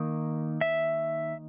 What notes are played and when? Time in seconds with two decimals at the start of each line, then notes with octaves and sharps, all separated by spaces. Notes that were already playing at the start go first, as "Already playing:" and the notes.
Already playing: D#3 A#3 D#4
0.61 E5